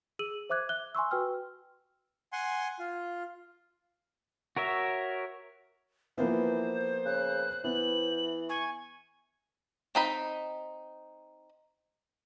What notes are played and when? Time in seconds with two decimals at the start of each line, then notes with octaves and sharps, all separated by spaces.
0.19 G#4 E6 D#7 F#7
0.50 C5 E5 D6 F#6 G#6
0.69 E5 F#6 G7
0.95 G#5 C6 C#6 E6
1.11 F#4 B4 G5 E6 F6
2.33 F#5 G#5 C6
2.79 F4
4.57 F#4 A#4 C#5 E5
6.18 E3 F3 A#3 B3 C5
7.06 C#3 F#6
7.64 E3 B3 F#7
8.49 G#5 C#6
9.95 C4 D#4 B5